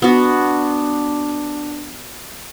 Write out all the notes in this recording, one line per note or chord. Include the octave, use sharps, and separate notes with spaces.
B3 D4 F#4